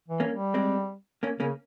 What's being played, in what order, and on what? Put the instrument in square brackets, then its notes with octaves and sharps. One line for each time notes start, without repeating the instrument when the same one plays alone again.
[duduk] E3
[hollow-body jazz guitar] A#3 C#4
[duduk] G3
[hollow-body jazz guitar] G#3 C4
A#3 C#4
[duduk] C#3 [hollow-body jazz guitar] A#3 C#4